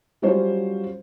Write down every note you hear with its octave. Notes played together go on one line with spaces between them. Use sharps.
F#3 G3 C#4 F4 C5 C#5